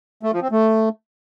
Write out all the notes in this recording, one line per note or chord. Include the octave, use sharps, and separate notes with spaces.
A3
F3
C4
A3